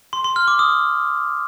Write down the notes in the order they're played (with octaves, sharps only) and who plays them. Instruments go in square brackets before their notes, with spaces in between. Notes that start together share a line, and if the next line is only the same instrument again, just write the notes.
[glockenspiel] C6
C6
F6
D6
D#6